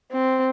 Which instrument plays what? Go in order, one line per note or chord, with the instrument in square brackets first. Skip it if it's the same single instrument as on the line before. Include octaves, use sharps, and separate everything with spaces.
[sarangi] C4